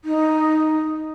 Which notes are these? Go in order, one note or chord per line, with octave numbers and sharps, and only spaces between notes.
D#4